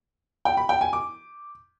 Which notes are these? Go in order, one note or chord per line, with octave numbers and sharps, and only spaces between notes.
G5
B5
G5
G#5
D6